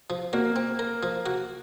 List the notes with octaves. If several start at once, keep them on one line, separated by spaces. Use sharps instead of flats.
F3
A#3 F#4
C4
A#4
F3
F#4